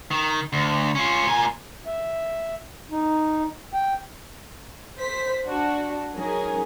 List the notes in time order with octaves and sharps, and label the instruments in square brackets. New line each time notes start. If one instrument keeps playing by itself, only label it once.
[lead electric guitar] D#3
D2
C#4 F4
A#2 G#5
[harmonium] E5
D#4
G5
[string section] C5 B6
D4 F#4
F#3 C#4 D#4 G#4 A#4